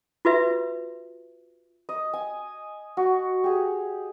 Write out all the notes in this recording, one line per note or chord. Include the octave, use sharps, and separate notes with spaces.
F4 F#4 B4 E5
D#5
G#5
F#4
G4 G#4